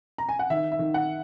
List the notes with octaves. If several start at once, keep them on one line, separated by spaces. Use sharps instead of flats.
A#5
G#5
F#5
D#3 E5
E5
D#3
F#5